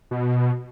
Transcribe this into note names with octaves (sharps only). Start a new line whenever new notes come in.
B2